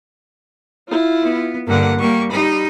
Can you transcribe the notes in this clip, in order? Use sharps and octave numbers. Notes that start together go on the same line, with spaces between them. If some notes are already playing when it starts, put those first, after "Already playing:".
E4 F4
B3
G2 D3 A#3 F#5
G3 A#3 C#6
G3 D#4 B5